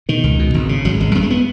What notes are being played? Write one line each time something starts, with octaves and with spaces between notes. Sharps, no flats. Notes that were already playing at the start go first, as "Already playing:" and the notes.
B2 D#3
C#2
B2
G#1
C#3
G#1 F#3
G#1 G#3
F#2 B3
G#3
B3